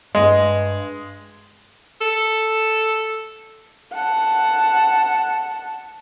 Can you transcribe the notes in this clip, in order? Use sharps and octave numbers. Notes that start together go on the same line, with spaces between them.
G2 G#3 D#5
A4
F#5 A5